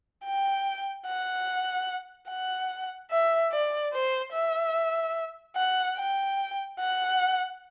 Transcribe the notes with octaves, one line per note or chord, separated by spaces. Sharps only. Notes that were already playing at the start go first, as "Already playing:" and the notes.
G5
F#5
F#5
E5
D5
C5
E5
F#5
G5
F#5